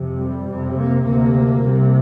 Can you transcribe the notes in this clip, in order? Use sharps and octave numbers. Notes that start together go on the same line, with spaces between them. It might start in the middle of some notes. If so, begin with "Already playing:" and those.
Already playing: F2 C3
G3
F2 C3
A#3
D2 C3 A#3
C2 C3